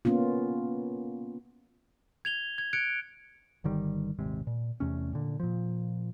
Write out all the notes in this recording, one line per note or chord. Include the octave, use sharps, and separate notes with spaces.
A#3 B3 C#4 F4
G#6 F7 G7
G#6
F#6 G#6 C#7 D7
G1 D3 D#3 G3
D#1 G#1 C3 G#3
A#2
E2 C3 A3 C#4
A#2 D3
A#2 F3